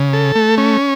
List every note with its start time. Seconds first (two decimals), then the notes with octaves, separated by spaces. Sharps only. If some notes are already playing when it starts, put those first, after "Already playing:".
Already playing: C#3
0.13 A4
0.35 A3
0.58 C#4